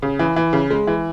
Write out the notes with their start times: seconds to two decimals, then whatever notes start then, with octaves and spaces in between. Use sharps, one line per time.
0.02 C#3
0.19 E3
0.36 E3
0.53 C#3
0.70 G#3
0.87 E3